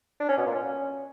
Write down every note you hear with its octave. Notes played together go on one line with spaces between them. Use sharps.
D4
C#4
B2
A#2
C#4